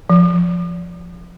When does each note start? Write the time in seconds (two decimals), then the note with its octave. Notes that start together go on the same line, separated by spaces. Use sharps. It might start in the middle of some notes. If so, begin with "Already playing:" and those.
0.10 F3